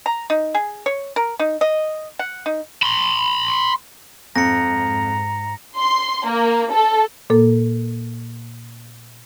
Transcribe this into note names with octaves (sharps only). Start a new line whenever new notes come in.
A#5
D#4
G#4
C#5
A#4
D#4
D#5
F#5
D#4
B5 C6
F2 G#2 A#5 A#6 C#7
C6
A#3
A4
A#2 A#3 A4